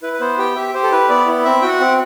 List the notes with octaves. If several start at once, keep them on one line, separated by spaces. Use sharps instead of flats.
E4 B4
B4
B3 C5
G4 G5
G4 E5
G4 C5
A4
E4 B4
B3 D5
E4
C4 E5
F#4 G5
F#5
C4